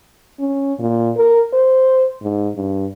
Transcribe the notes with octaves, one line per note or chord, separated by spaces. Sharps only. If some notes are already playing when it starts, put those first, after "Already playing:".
C#4
A#2
A#4
C5
G#2
G2